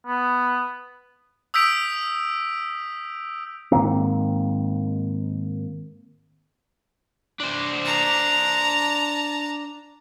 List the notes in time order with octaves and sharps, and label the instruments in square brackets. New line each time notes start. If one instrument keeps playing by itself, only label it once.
[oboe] B3
[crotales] D#6 E6 G6 B6 D7 F7
[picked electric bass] G#2 D#3 A#3 C4
[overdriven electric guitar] D4 C5
[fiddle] A5 A#5